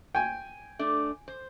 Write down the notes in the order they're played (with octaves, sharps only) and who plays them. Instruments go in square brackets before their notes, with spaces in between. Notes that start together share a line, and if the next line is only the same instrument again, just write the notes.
[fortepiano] G5 G#5
[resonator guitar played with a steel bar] A3 D4
C5